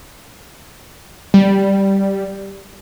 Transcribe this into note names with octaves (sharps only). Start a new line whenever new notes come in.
G3